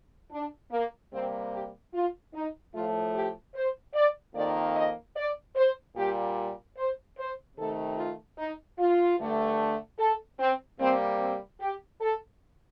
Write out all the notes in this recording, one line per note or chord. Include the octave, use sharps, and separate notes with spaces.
D4
A#3
C3 G3 A#3 C4
G4
F4
D#4
A2 F3 A3 F4
G4
C5
D5
F2 D#3 A#3 D5
D#5
D5
C5
A#2 G3 A#3 G4
C5
C5
C3 D#3 A3 A4
F4
D#4
F4
G2 D3 A3
A4
C4
C3 G3 A#3 C4
C4
G4
A4